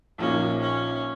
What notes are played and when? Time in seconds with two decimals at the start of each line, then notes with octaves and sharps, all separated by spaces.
0.18 A#1 A#2 F3 A#3 C#4 D#4
0.60 C#4